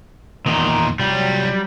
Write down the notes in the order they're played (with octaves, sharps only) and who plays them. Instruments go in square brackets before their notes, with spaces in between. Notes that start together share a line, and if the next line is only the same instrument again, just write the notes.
[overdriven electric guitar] E2 D#3 [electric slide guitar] A#2 D#4
[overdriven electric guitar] C2 F4 [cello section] F#3 [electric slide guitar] G3